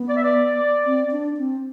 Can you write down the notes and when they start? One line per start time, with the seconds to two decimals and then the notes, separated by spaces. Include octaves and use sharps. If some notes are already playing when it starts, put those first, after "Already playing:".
Already playing: B3
0.09 D5
0.17 E5
0.24 D5
0.86 C4
1.11 D4
1.37 C4